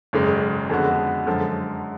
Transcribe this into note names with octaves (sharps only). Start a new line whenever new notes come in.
G#1 F#2 C#3 G#3
F2 D3 G#3 B3 F#4
F#2 D3 F3 G#3